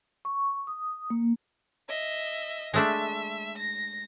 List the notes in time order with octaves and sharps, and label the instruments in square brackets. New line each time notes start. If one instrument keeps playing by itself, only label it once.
[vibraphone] C#6
D#6
A#3
[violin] D#5 E5
[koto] G#3 A3 D4 [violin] E5
[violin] A#6